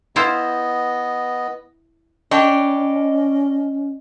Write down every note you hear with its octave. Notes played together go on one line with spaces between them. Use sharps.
B3 E4 F4 C5 D#5
C#4 D4 C#5 D#5 G5 B5